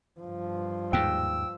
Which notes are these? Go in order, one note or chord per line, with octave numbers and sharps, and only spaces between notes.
G2 F3
D#2 G#2 G5 E6